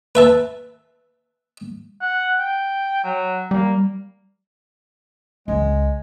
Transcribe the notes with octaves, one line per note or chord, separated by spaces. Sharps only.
B4 E5 A5
F#5
G5
F#3
G3 A#3
C#2 G#3